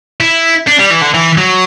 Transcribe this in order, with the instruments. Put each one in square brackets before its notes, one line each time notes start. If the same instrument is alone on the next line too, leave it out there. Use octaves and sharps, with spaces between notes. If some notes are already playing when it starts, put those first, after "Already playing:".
[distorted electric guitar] E4
D4
G3
E3
D3
E3
F#3